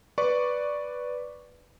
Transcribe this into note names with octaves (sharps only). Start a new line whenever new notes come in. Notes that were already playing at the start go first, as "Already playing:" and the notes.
B4 D5 C#6